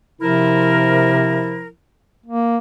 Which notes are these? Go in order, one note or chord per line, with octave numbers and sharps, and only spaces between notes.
C3 F3 E4 A#4
A#3